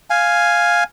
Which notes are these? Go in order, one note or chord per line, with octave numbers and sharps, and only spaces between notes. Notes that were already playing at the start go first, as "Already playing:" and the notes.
F5 G#5